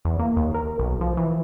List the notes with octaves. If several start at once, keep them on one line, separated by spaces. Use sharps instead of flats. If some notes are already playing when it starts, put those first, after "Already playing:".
E2
A#3
D#2
A#4
B1
F3
E3